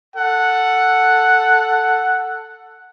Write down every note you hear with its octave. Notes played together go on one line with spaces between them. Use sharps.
A4 F#5